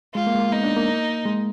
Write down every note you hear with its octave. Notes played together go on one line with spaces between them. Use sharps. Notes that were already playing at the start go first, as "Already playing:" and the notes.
G#3 F4
A#3
G#3
A#3
B3 D#4
D4
A#3
G#3